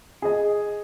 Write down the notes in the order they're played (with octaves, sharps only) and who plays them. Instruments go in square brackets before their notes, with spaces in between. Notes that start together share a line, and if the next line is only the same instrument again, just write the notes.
[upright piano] G#4 D#5